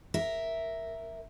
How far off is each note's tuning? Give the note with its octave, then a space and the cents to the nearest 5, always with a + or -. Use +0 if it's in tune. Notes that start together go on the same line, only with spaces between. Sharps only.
A#4 +0 E5 +0